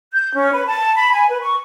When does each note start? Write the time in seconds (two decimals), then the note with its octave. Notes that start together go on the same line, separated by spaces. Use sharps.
0.13 G6
0.34 C#4
0.52 B4
0.67 A5
0.95 B5
1.12 G#5
1.28 B4
1.41 C#6